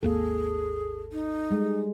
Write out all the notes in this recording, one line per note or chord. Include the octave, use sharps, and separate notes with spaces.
G#1 D#2 A#3 G#4 A4
D#4
G3 G#3